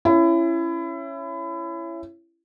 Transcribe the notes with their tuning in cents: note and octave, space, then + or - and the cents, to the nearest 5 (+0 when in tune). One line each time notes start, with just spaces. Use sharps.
C#4 -5 E4 +25